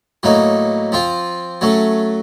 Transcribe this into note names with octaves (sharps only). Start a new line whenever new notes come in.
A2 F#3 A#3 D#4
F3 C4 F4
F#3 A3 C#4